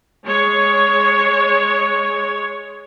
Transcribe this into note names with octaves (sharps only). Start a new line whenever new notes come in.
G#3 C#5